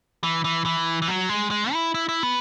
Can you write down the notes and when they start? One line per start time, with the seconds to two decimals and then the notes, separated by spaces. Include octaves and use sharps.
0.24 E3
0.44 E3
0.65 E3
1.02 E3
1.08 F#3
1.29 G#3
1.51 G#3
1.73 E4
1.94 E4
2.09 E4
2.23 B3